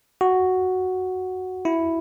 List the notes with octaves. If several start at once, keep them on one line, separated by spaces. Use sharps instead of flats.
F#4
E4